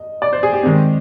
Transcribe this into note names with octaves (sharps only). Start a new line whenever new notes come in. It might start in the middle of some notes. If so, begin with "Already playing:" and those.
Already playing: D#5
D5
C5
G#4
G4
D#3 G#3 C4